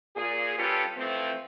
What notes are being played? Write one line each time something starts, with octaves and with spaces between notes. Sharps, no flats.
A#2 G#4
G3 C#4 F4 G4 A4 B4
E3 F3 A3 C4